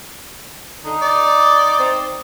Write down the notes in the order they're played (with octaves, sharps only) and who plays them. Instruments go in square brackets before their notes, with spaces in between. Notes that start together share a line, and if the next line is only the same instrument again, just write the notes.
[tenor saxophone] D3 [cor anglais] D#4
[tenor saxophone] D5
C4